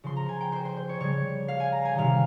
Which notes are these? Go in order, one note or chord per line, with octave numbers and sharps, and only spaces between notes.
C#3 F3 C6
A#5
G#5
G5
C5
C5
C5
C#5
C#3 G3 C#5
F5
G#5
A#5
G#5
C3 D#3 G3 F5